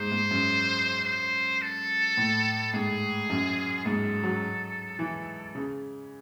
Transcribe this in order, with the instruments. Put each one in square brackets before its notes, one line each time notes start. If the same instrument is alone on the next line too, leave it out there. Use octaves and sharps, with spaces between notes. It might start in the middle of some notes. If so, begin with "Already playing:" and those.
Already playing: [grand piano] G#2 [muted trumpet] C5
[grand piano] G#2
F#2
[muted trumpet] C5
A4
[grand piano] A2
[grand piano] G#2 [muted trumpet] G#4
[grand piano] F#2
[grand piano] G#2 [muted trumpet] A4
[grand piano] F#3
E3
C#3